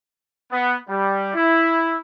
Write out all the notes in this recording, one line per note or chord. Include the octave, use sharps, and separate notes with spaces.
B3
G3
E4